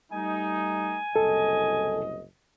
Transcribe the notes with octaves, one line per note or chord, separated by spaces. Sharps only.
G3 A3 D#4 G#5
F#1 C2 A4 D#5